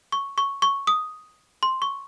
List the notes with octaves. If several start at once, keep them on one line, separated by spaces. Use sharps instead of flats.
C#6
C#6
C#6
D#6
C6
C#6